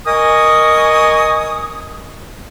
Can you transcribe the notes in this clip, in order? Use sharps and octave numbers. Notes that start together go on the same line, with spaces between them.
A#4 D#5 G#5 C#6 D#6